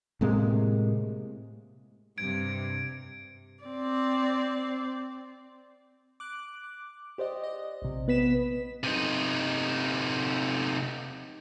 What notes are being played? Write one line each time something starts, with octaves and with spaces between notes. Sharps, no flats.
A2 C3 G#3 A#3
G2 C3 G#6 D7
C4 D5
D6 F#6
G4 C5 D5 D#5
D#5
A#1 C3
B3 B4 B6 E7
C3 D#4